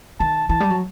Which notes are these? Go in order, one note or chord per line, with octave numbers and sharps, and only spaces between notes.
D#3 A5
E3 A5
G3
F#3